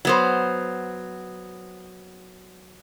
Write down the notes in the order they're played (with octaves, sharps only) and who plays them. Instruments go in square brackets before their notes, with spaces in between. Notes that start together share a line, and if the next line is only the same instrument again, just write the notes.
[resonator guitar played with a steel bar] F#3 B3 C5